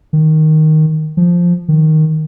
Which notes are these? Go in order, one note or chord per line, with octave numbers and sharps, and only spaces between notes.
D#3
F3
D#3